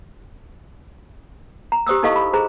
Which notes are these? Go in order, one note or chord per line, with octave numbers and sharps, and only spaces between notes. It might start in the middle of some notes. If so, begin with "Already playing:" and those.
A#5
G4 C5 D#6 E6
D#4 E4 A4 D#5 F5 C#6
B5
G#4 C5 A#5